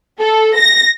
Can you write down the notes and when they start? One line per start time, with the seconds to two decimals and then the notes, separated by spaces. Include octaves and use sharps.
0.20 A4
0.55 A#6